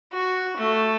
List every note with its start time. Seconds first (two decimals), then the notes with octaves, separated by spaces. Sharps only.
0.13 F#4
0.56 A3